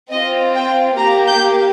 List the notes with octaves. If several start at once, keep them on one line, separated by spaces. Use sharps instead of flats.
C4 F4 D#5
G5
A#3 G4 A#5
G6